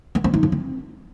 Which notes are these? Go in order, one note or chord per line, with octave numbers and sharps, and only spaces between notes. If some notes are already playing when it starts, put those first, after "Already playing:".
B3
C4
D#4
C#3
C4